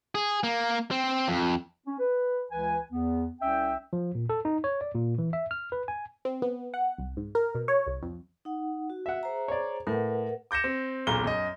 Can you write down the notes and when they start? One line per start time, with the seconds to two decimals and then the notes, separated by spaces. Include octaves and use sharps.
0.15 G#4
0.43 A#3
0.91 C4
1.28 F2
1.86 C#4
1.99 B4
2.51 C#2 E3 B4 G#5
2.92 E2 B3
3.41 C2 C#4 E5 G5
3.93 F3
4.15 A#2
4.29 A4
4.45 D#4
4.64 C#5
4.81 D5
4.94 A#2
5.18 E3
5.33 E5
5.51 F6
5.72 B4
5.88 G#5
6.25 C4
6.42 B3
6.74 F#5
6.98 C2
7.17 G#2
7.35 A#4
7.55 B2
7.68 C#5
7.87 C2
8.03 F2
8.45 D#4 F#5
8.90 F#4
9.06 E5 F#5
9.23 G#4 C5 A#5
9.48 C#5 D5
9.87 A2 A#4 B4 F#5
10.51 D6 G6 A#6 C#7 E7
10.64 C4
11.07 E1 B1 A#2 A#5 G7
11.24 F#2 D#5